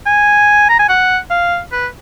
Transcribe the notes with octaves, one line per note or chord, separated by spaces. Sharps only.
G#5
A#5
G#5
F#5
F5
B4